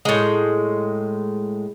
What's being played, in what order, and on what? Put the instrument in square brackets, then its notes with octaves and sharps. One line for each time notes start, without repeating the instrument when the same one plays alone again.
[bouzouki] A2 G#3